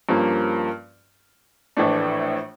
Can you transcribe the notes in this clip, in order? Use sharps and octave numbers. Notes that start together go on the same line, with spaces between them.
G2 F3 A#3 C#4
A#1 A2 E3 A3 D4